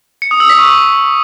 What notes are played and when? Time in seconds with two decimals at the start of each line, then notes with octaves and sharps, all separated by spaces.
0.22 C#7
0.31 D#6
0.40 E6
0.49 B6
0.59 C#6